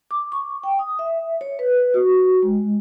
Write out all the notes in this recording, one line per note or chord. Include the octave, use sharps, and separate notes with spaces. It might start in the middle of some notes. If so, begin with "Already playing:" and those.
D6
C#6
G5
D#6
E5
C#5
B4
F#4
G#3